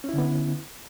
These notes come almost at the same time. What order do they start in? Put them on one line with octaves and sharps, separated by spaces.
C#4 E4 D3 B3